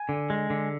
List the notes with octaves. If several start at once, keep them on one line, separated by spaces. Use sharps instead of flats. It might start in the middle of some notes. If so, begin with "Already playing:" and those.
Already playing: G#5
D3
G#3
D3